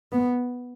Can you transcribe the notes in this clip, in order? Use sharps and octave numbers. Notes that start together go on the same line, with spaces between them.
B3